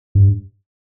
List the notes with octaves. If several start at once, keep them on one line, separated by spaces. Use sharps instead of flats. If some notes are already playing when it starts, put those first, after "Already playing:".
G2